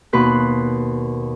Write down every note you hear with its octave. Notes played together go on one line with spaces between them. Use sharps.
D#2 B2 B4 C6 F#6